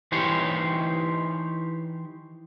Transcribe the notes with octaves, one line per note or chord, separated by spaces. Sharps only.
E3 D#4 G4 C5 C#5